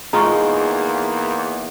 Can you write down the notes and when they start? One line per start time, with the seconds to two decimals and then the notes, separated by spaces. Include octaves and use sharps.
0.13 E2 G#3 A#3 D#4 F4 A#5 C#6